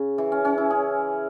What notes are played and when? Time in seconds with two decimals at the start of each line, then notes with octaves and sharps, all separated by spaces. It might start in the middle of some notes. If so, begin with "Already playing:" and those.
Already playing: C#3
0.18 E3
0.32 C#4
0.45 C#4
0.58 E4
0.71 G#4